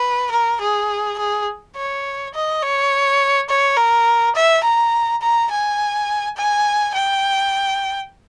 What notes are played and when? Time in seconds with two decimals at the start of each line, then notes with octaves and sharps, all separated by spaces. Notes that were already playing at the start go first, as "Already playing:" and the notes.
Already playing: B4
0.31 A#4
0.61 G#4
1.18 G#4
1.76 C#5
2.34 D#5
2.63 C#5
3.49 C#5
3.77 A#4
4.35 E5
4.63 A#5
5.21 A#5
5.51 G#5
6.37 G#5
6.94 G5